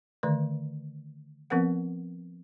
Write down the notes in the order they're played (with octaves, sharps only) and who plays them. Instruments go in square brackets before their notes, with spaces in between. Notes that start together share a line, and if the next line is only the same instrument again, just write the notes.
[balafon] D3 D#3 A3 B4 D5
F3 B3 C4 A#4 B4 F#5